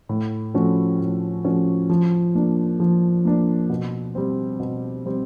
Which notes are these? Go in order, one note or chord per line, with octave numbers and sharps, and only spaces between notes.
A2
F3 A3 C#4 F#4
A2
F3 A3 C#4 F#4
F3
A#3 D4
F3
A#3 D4
B2
G3 C4
B2
G3 C4